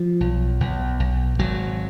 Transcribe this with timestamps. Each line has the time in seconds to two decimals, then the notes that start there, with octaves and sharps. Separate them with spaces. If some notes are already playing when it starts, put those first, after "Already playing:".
Already playing: F3
0.21 B1
0.60 B1
1.00 B1
1.39 G#1 F#3